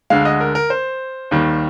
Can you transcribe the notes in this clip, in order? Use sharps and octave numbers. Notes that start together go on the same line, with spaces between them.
D2 D3 G#3 F5
D#5
A#4
A#4
C5
D#2 D#3 G3